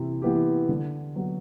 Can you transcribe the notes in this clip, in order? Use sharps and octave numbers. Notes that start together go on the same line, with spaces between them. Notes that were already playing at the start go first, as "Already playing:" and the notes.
Already playing: C3 E3 E4
E3 B3 E4 G4
D3
F#3 B3 F#4